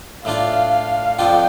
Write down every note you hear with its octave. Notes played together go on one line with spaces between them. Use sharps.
A2 A3 D4 F4 F5
F5
F2 D3 F3 D4 F4 G5